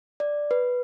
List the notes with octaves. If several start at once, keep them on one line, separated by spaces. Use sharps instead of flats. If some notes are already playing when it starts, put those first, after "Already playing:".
D5
B4